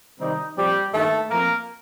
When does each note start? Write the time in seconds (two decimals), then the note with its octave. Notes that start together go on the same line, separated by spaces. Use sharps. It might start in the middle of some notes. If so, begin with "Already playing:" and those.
0.20 C3 D#3 G3 C4 D#4
0.57 A#2 F3 G3 C4 G4
0.94 G2 D#3 A3 A#3 A4
1.30 A#2 F3 A3 A#3 C4 A#4